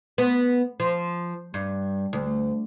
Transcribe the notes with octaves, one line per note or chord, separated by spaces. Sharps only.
B3
F3
G2
D2